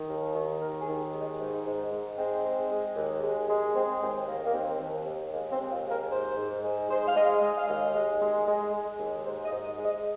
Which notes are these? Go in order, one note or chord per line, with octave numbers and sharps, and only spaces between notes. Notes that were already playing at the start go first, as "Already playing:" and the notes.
Already playing: D#3
D#2
D#3
D#2 A#4
G#4
D#3
G#3
D#4
G#2 D#4
G#2
G#2
G#3 C4
G#3
G#3
D#2
G#3
G#3
G#3 C4
D#2 C4
D#3 A#3
A#3
D#2 C4
D#2
D#2
G#3 A#3
C4
D#2
F4
G#3
A#4
G#2 C5
G#2
G#3
G#3 C5
F5
G#3 D#5
G#3 D#5
F5
D#2 D#5
G#3
G#3
G#3
G#3
D#2
G#2 C5
D#5
G#2
D#5
G#3
D#5